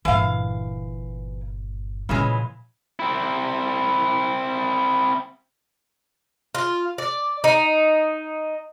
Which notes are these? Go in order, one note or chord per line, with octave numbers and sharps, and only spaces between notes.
G1 A#2 E3 F5
A#2 C#3 E3 F3 G#3
C4 E4
F4
D5
D#4